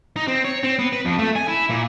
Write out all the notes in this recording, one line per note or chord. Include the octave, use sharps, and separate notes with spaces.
D#4
C4
C#5
C4
B3
B4
F2
A3
G#5
E4
A#2